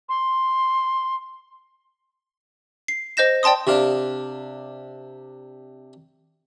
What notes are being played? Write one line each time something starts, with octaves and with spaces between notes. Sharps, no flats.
C6
C7
C5 D#5 G6 A#6 E7
D5 G5 A5 C6 D#6
C3 D4 F5